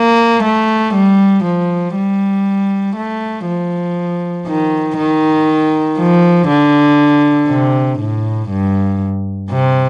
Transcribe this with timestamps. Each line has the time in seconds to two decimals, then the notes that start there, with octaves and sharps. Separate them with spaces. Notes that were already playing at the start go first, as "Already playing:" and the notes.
Already playing: A#3
0.44 A3
0.95 G3
1.45 F3
1.96 G3
2.96 A3
3.46 F3
4.47 D#3
4.98 D#3
5.99 F3
6.48 D3
7.49 C3
7.99 A2
8.50 G2
9.51 C3